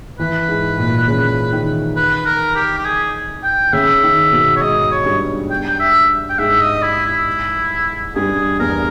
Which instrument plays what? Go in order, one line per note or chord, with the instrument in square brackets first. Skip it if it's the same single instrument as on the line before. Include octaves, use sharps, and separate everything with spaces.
[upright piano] E3 [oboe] B4
[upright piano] G#2
A#2
C#3
D#3
[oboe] B4
A#4
G4
G4
G#4
G5
[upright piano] C#3 [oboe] E5
[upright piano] D#3
B2
[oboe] C#5
[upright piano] G#2 [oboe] D#5
[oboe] C#5
[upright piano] G2
[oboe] G5
G5
E5
G5
[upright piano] G#2 [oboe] E5
[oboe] D#5
E4
E4
[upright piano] G2 [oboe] G#4
[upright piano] E2 [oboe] A#4